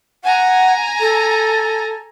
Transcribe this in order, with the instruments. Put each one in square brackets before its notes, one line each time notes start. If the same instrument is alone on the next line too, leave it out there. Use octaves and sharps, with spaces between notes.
[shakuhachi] F#5 [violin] G#5 A#5
[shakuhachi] A4